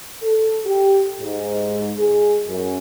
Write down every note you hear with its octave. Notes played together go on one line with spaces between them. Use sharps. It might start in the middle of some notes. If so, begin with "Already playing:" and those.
A4
G4
G#2
G#4
F#2